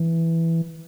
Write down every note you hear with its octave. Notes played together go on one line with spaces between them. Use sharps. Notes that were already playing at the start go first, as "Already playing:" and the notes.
Already playing: E3